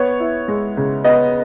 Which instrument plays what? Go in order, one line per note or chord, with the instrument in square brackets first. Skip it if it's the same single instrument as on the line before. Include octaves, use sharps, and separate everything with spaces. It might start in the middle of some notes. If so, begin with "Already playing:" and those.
Already playing: [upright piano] B3 C#5
E4
G#3
C#3
B3 D#5